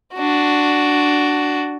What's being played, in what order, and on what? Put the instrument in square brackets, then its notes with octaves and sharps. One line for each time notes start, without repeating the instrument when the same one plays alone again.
[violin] D4 F#4